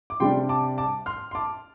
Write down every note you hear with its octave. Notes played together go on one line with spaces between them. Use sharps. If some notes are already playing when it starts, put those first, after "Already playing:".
D6
C3 G3 D4 G5 C6
A5 D6
A5 D6
C6 F6
C6
A5 D6